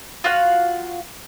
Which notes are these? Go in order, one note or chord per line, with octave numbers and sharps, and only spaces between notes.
F4 F#4 F5 F#5